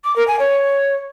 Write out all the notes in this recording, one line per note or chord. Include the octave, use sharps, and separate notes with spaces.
D6
A#4
G#5
C#5